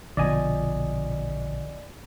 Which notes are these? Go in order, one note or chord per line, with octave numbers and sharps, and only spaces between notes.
A#1 B2 D3 F3 D5 D#5 G#5